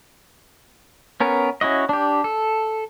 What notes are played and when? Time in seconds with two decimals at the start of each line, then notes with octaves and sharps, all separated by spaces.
1.20 B3 C#4 A#4
1.61 C#4 E4 F#4 D#5
1.89 D4 G4
2.24 A4